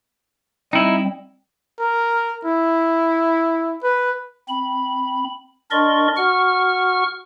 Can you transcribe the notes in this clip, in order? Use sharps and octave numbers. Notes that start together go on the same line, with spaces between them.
G3 C4 D#4 E4
A#4
E4
B4
C4 B5
D4 A#4 D5 D#5 C6 C#6
F#4 F#5 C#6 F6